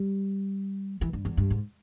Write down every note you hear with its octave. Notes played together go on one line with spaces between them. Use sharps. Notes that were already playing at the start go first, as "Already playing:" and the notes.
Already playing: G3
E3
G2
E2
G2
G#2